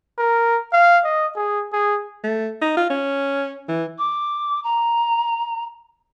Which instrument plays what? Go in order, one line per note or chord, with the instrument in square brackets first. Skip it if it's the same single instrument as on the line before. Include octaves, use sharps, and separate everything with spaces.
[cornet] A#4
F5
D#5
G#4
G#4
[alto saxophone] A3
D#4
F4
C#4
E3
[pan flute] D6
A#5